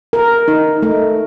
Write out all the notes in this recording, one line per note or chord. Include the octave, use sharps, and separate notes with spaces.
A#4
D#4
A3